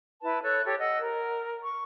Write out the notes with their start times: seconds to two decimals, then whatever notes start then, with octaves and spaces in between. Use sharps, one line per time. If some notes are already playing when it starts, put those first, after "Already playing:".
0.23 E4 B4 A5
0.43 A4 C#5 E6 F#6
0.64 G4 A4 C#5
0.79 D#5 F#5 E6
0.99 A#4
1.63 C#6